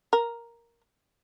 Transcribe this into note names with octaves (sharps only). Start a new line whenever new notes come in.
A#4